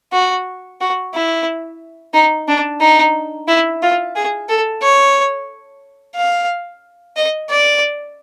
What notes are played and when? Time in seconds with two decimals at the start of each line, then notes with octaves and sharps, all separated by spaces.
0.13 F#4
0.81 F#4
1.14 E4
2.14 D#4
2.48 D4
2.81 D#4
3.48 E4
3.82 F4
4.16 G#4
4.49 A4
4.82 C#5
6.16 F5
7.17 D#5
7.50 D5